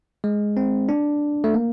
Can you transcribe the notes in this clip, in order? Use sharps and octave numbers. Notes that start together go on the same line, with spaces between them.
G#3
C4
D4
A3
A#3